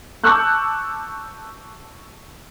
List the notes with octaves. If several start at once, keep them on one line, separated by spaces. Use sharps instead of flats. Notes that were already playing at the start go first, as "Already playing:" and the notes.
A5 C#6 D6 E6 F#6 G6